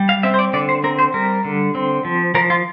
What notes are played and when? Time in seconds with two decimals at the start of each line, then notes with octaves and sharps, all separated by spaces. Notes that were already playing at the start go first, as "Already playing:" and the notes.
Already playing: G3
0.09 F5
0.23 C4 E5
0.34 C5
0.39 D5
0.53 D3 D5
0.69 C5
0.84 C4 A#4
0.99 C5
1.14 G3 A#4
1.45 D3
1.75 C4
2.05 F3
2.35 F3 A#4
2.50 F4